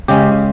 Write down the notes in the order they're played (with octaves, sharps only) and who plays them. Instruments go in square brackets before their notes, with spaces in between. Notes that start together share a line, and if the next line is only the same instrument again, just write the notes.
[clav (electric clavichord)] C#3 G#3 C#4 G4